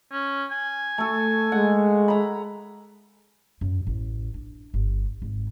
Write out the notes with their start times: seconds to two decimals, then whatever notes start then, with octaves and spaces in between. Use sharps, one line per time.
0.12 C#4
0.51 G#5
0.98 A3 A4
1.52 G#3 F#5
2.08 A#5 B5
3.61 F#2
3.87 A1
4.34 D4
4.74 G1
5.22 G#1